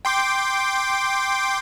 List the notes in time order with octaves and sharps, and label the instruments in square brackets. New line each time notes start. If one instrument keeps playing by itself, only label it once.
[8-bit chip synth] G5 C6 D6